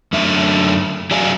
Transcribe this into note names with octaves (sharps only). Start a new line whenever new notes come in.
F#2 D3 A3 E5
F#3 G#4 D5 E5 F5 G#5